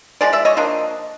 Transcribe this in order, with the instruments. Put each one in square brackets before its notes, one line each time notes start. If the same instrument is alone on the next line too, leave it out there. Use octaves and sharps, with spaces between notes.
[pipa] F3 G#3 D5
D5 E5
C#5 D#5
F3 A#3 D4 D#5